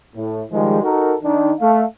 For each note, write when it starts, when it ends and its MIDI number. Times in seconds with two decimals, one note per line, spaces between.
0.16 0.42 45
0.52 0.82 51
0.52 0.82 53
0.52 0.82 55
0.52 0.82 56
0.83 1.15 63
0.83 1.15 66
0.83 1.15 69
0.83 1.15 70
1.23 1.53 51
1.23 1.53 62
1.23 1.53 63
1.60 1.83 57
1.60 1.83 77